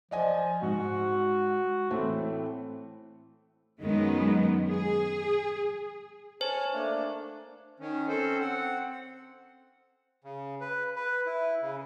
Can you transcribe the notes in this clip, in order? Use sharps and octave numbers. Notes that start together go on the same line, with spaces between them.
F3 D5 D#5 G#5
G#2 F#4
A2 E3 A3 C4
F#2 D#3 G#3 B3
G#4
C5 C#5 G#5 A5
A3 A#3 D4
D#3 C#4
C4 C#4 A4 C5
C4 F#5
C#3
B4
B4
E4
C#3